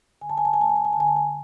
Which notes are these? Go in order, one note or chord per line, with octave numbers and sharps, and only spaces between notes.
D3 G#5
A5
G#5
A5
G#5
A3 A5
G#5
A5
G#5
A5
D3 G#5
A5
G#5